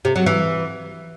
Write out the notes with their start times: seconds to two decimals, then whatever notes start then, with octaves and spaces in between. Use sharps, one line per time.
0.05 C3
0.16 F#3
0.26 E3